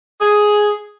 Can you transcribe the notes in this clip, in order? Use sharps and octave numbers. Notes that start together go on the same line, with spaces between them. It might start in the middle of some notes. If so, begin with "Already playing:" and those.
G#4